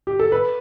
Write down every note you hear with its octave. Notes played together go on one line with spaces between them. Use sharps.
G4
A4
B4